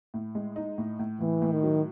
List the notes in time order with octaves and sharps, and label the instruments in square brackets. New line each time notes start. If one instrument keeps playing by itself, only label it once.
[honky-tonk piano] A2
G#3
D#4
A2
A2
[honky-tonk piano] A2 [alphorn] E3
[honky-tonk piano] A2
[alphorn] D#3
[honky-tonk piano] F#3